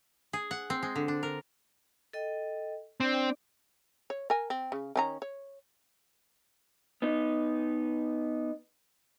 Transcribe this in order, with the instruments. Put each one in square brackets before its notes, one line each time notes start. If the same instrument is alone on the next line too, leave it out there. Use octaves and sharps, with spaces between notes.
[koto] G#4
F#5
C4
G#3
D3
D4
A#4
[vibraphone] A4 D#5 G5
[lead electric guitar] C4 [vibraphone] D4 D5
[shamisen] C#5
A#4 G#5
C4
C#3
D#3 C#4 A#5
C#5
[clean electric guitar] B3 D#4